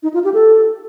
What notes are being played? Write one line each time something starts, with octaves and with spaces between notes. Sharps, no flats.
D#4
F4
G4
A4